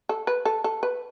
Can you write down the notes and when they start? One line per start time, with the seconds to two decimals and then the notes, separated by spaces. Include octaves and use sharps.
0.09 A4
0.27 B4
0.45 A4
0.64 A4
0.83 B4